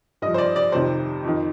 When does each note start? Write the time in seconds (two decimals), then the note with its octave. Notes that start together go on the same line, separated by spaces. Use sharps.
0.22 G2 F3 D#5
0.34 C5
0.38 D5
0.56 D5
0.72 F2 C3 D#3 C5
1.24 F2 D#3